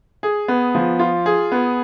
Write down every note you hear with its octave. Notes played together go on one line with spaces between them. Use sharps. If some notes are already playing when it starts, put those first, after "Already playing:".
G#4
B3
F3
F4
G#4
B3